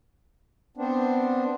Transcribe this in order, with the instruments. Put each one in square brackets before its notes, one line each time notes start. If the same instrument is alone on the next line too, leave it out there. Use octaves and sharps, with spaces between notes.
[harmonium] B3 C4 D4